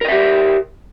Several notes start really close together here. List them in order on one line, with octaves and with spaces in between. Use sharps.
A#4 D#5 E5 G4